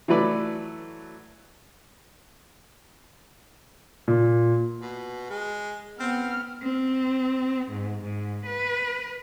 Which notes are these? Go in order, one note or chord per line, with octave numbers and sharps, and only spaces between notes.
E3 F#3 A3 B4 D5
A#2
B2
G#3
B3 C4 F6
C4
G#2
G#2
B4